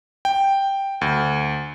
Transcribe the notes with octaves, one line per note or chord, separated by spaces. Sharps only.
G5
D2